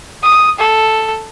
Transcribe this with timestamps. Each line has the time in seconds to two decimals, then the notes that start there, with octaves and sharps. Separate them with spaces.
0.23 D#6
0.59 A4